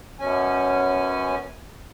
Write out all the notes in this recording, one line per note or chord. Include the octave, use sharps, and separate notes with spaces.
F#2 B2 C#4 G#5